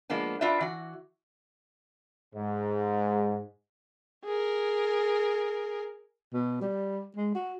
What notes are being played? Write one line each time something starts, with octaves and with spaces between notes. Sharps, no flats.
F3 G#3 A#3 B3 D4
D4 F4 F#4 B4 D5 E5
E3 F#4
G#2
G#4 A#4
B2
G3
G#3
F#4